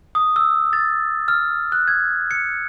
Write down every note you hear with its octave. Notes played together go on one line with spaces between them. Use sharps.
D#6
E6
A6
F6
F#6
G#6
C#7